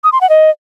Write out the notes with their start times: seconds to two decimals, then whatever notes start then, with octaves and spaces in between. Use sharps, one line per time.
0.04 D#6
0.12 C6
0.21 F#5
0.29 D#5